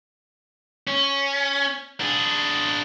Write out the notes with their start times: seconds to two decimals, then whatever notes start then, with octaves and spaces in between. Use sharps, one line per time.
0.87 C#4
2.00 D4 G#4